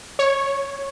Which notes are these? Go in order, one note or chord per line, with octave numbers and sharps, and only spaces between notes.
C#5